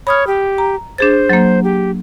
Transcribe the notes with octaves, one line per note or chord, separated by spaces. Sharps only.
C#5 B5 D#6 F6
G4
A#5
D4 G#4 C5 A6
F#3 A#3
G4